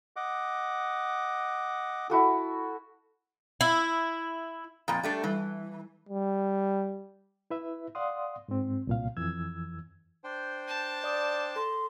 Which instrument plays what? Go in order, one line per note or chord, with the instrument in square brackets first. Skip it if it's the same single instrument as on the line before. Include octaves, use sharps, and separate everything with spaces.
[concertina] D#5 F#5 D6
[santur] E4 F#4 A4
[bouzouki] E4
[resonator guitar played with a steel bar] F2 A#2 [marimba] A#5 B5
[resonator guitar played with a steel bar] G3 A3 D4
[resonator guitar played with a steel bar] E3 [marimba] G3
[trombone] G3
[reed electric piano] E4 B4 E5
D5 F5 F#5 C6 D#6
G#2 C4
C2 A#2 F5
F2 E3 E6 G#6
[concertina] D4 C5 G5
[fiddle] A5
[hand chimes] D5 D6 D#6
[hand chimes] A4 [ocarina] C6